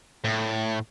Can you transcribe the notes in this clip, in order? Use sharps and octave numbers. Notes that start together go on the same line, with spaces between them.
A2